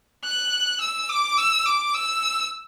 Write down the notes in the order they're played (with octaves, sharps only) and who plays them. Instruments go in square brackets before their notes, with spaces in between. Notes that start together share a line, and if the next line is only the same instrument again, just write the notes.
[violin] F#6
E6
D6
E6
D6
E6